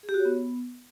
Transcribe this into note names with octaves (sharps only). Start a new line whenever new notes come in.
G#4
G4
F#4
C#5
B3